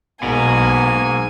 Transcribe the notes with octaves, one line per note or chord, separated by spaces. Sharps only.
B1 G#2 B2 A#3 G#5